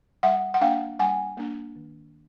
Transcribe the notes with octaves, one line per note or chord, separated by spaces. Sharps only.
G3 E5 F#5
F#5
A#3 D4 F5 G5
G3 F#5 G#5
A#3 D4
D#3